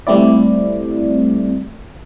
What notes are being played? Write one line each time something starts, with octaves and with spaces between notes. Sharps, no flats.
G3 A3 C4 E4 D5